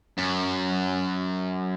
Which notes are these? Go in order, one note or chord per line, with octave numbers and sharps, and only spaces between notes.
F#2